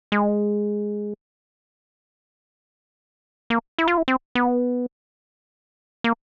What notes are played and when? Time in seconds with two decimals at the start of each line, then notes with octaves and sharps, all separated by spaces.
0.12 G#3
3.50 A#3
3.78 E4
3.88 F4
3.98 E4
4.08 C4
4.35 B3
6.04 A#3